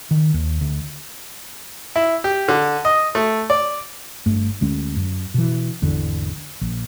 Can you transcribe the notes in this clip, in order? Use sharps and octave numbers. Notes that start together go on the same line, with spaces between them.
D#3
D#2
D2
E4
G4
D3
D#5
A3
D5
G1 G2 A3
D2 G#3 C#4
F#2
B2 E3
G#1 E2 D3
A#1